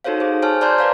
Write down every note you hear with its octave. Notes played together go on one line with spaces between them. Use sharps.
D#4 F#4 A4 C5 C#5 F5
G#4 C5
C5 C#5 G#5 A5 F6
C5 D5 A5 A#5 C6 G6
B4 D5 F5 A#5